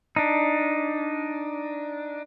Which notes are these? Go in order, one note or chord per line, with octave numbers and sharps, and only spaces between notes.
D4 D#4